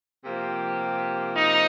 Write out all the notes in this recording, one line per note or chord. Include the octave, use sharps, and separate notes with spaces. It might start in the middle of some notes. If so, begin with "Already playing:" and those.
C3 F3 A#3 G4
D#4